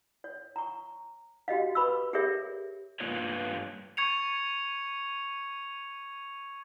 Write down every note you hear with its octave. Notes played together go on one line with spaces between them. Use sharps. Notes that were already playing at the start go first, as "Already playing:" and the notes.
C#5
A#5 C#6
F#4 G4 D#5 F5
B4 B5 C#6 E6
G4 G#4 A#4 C#5 E5
G2 A#3 F4 B4 C#5
C#6 G#6 C#7 F7